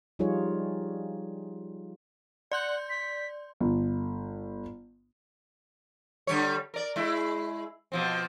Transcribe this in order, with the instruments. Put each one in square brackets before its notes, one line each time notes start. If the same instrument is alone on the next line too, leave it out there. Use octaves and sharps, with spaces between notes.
[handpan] F3 G3 D#4 F4 G#4 C#5
[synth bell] D5 C6 G6 [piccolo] F#5
[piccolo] B6
[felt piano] G1
[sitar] D3 G3 C#5
A#4 D5
G#3 E4
B2 F3 C4